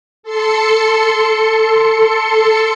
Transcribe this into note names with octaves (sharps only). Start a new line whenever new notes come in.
A4 C6 C#7